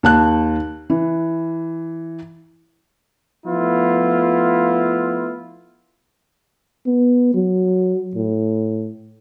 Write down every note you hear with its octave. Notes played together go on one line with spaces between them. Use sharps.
D#2 A5 F#6
E3
F3 A3 B3 E4 F4
B3
F#3
A2